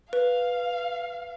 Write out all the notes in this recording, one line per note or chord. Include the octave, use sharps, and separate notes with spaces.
B4 F5